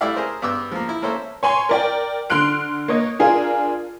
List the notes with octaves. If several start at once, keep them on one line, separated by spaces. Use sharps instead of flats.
G3 A3 E4 D5 E5 F5
G#4 A#4 C5
G2 B3 D6 E6
F3 A#3
E4
A#3 C#4 A4 C5 E5
C#5 G#5 C6 C#6
A#4 D5 G5
D3 C6 F6 F#6 D7
A#3 C#5 D#5
D4 F4 G#4 A#4